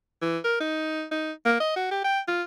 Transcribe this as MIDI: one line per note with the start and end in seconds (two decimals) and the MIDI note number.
0.22 0.38 52
0.44 0.57 70
0.60 1.05 63
1.11 1.32 63
1.45 1.56 58
1.60 1.71 75
1.76 1.91 66
1.91 2.04 67
2.04 2.20 79
2.28 2.43 65